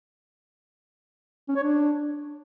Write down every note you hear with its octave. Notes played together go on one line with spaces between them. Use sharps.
C#4
C#5
D4